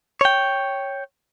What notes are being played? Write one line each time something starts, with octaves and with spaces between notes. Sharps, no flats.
C#5 G5